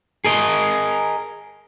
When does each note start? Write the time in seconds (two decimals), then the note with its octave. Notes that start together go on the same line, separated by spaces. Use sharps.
0.25 G#4 A#4 D#5